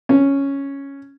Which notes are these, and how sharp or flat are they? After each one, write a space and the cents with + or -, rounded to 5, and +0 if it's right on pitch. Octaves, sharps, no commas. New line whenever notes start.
C#4 +0